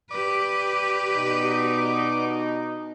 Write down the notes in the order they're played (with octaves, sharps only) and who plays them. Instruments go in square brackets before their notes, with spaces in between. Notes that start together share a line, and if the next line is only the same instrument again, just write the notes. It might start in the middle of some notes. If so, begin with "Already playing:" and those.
[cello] G4 B4 [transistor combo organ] D5 D6
[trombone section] B2 D#4